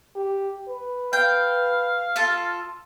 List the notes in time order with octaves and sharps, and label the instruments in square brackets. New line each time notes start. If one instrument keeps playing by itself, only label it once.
[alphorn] G4
B4
[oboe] F5 [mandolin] G5
[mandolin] F4 A4 A5